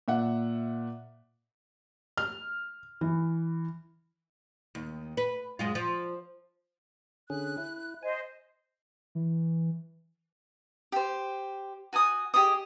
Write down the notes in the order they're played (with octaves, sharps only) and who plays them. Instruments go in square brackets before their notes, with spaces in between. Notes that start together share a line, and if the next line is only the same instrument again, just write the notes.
[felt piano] A#2 E5 F#5
F6
E3
[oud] D#2
B4
F#2 G#3 F4
F3
[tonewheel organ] D3 C#4 G#4 [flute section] F#6
[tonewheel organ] E4
[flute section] C5 D#5 [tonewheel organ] G#5
[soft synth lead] E3
[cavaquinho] G4 C5
F#4 G#5 A5 D#6
G4 G#4 D#5 D#6